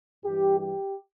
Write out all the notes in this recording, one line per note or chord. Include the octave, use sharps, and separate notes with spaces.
G2 E3 G3 G4
G4